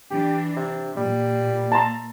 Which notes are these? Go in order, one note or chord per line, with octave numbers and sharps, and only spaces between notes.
E3 D4 G4
C3
A#2 G3
A5 A#5 C6